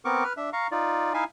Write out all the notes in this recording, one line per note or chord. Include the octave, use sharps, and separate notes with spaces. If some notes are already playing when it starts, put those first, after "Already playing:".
B3 C4 A#4 C#6 D6
B4 F6
D4 E5
F5 A#5 C#6
D#4 F4 D5
D#4 E4 E5 F5 G#5